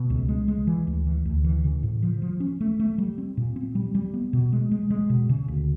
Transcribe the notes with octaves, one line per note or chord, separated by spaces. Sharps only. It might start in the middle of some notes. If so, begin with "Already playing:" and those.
Already playing: B2
C#2
G#3
G#3
E3
D2
E3
D2
E3
C#3
A2
F3
F3
C#4
A3
A3
G3
C4
A#2
C4
G3
G3
B3
B2
G#3
G#3
G#3
B2
C#3
D2